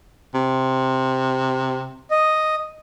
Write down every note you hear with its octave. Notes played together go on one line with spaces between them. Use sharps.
C3
D#5